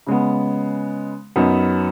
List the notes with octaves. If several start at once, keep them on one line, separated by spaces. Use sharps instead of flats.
C#3 G#3 B3
F#2 F#3 B3 D#4